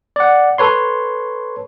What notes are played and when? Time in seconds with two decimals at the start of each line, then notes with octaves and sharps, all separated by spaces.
0.16 D5 F#5
0.58 A4 B4 C#5 C6